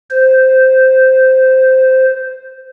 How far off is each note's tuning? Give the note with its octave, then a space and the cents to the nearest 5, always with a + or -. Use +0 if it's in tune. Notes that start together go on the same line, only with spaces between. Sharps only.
C5 -5